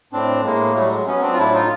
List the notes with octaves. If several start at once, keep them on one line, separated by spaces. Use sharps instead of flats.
A2 C4 D4
A2 G#3 A#3
F#3 G3 A3
G#3
F#3 B3 C#4
C4 D4
F4
A2 D4 E4
D#4 F4